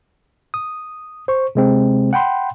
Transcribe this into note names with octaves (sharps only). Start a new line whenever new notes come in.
D#6
C5 C#6
C3 G#3 C4
F#5 G5 B5 C6